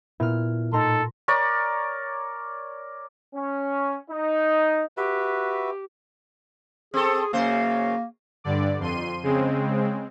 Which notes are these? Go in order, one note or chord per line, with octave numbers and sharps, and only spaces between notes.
A#2 B3 E4 F6
A2 D#4 A4 A#5 C6
A#4 C#5 D5 C#6
C#4
D#4
F#4 G4 B4 E5
C4 G#4 A4
F#2 C#3 A#3 C5
G2 D3 D5
F2 C6 D#7
C#3 G#3 C4